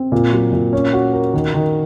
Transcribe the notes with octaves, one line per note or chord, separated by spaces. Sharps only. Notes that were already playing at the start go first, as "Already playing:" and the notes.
Already playing: C4
A#2
F#3
A#2
C#4
F#4
A#4
D#3
D#3